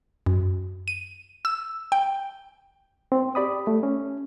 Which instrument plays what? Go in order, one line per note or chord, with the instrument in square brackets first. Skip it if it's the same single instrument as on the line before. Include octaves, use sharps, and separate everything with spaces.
[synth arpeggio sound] F#2
D#7
E6
G5
[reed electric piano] C4
G4 D5 B5 D#6
A3
C#4